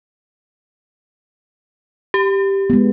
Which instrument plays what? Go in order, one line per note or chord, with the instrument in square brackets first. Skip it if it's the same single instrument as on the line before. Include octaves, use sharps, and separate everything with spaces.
[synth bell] G4
[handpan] G#3 B3